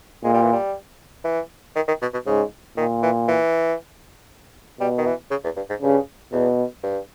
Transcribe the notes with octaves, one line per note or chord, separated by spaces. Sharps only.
A#2 G#3
G3
E3
G3
E3
D#3
D#3
B2
B2
G#2 C#3
A#2 D#3
E3
E3
B2 G3
D#3
E3
C#3
E2
G2
G#2
G2 C#3
E2 B2
G2